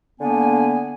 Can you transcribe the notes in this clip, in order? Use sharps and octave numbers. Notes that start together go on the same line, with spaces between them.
D3 A#3 B3 G#5